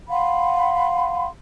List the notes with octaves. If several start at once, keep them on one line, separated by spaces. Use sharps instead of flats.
F5 F#5 B5 C6